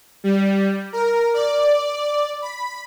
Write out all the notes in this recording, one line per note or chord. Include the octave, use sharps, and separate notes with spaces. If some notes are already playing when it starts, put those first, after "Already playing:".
G3
A#4
D5
B5